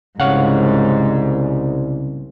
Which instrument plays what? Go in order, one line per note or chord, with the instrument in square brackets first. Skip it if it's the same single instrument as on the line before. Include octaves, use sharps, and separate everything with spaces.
[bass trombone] C2 [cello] G#2 [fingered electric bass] C#3 [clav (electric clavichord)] C#5 F5 F#5